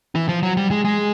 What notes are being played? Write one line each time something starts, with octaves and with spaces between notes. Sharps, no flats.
E3
F3
F#3
G3
G#3
G#3